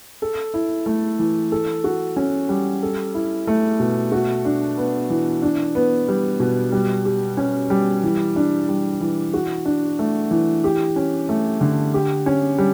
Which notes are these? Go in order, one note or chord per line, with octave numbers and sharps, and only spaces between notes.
A4
E4
A3
E3
A4
F#4
C#4
G3
A4
E4
A3
B2
F#4
D4
B3
E3
D4
B3
G3
B2
G3
G4
C#4
G3
E3
D4
G3
E3
F#4
D4
A3
E3
G4
C#4
A3
D3
G4
C#4
G3